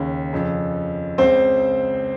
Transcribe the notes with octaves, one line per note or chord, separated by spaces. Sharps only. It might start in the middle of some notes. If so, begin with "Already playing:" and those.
Already playing: D#2 C#3
F2 C#3
C#2 C#3 C4 C5